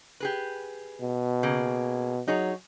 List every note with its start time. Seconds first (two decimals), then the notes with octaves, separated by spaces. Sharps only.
0.20 G4 G#4 B4
1.01 B2
1.43 C#3 A#3 G#4
2.28 F#3 D#4 G#4 C#5